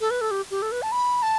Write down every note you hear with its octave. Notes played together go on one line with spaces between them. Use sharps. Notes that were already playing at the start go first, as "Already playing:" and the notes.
A4
B4
A4
G4
G4
A4
B4
A5
B5
A5